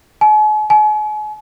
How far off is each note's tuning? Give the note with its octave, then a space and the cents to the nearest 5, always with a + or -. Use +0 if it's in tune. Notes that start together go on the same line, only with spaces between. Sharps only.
G#5 +45
G#5 +40